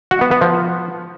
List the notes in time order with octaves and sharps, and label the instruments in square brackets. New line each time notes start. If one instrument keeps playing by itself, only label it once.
[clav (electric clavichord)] F#4
B3
B3
F3